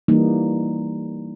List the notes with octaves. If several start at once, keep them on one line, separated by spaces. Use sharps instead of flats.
E3 G3 A#3 D#4